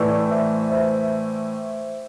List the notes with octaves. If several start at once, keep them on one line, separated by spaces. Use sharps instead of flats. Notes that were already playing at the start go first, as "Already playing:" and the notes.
Already playing: A2 E3 A3 B4 D5
C5 E5
C5 E5